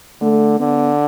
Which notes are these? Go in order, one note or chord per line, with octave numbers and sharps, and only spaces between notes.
D3 A3
D3 B3